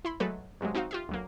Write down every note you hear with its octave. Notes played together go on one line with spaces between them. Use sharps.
E4 B5 C6
F#3 G#3 A3 A4 B4
G2 C3 F#3 G#3
C4 D#4 F#4 C5 F5
F4 G4 E5
D2 F#3 A#3